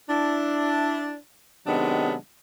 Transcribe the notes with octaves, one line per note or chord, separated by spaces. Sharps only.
D4 E4
C3 D#3 F#3 G#3 B3 D4